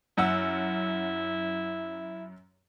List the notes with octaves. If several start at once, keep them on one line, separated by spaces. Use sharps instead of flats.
F#2 E4 F#5 E6